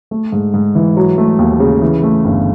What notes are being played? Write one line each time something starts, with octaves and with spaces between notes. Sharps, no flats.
A3
G#2
G#2
E3
F#3
A3
D#2
C#3
E3
A3
G1